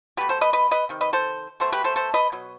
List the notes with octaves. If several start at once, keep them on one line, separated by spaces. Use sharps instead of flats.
B2 A3 G4 B4
A4 C5
B4 D#5
B4 D#5
B4 D#5
C3 D#3
B4 D#5
A4 C5
B2 A3 A4 C5
G4 B4
A4 C5
A4 C5
B4 D#5
B2 F#3